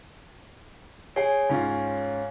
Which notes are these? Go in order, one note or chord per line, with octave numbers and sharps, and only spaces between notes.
G#4 C#5 G#5 C7
G#2 C#4 F4